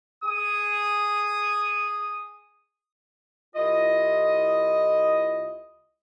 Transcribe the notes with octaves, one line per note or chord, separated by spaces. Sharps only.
G#4 D#6
C2 E4 F4 D#5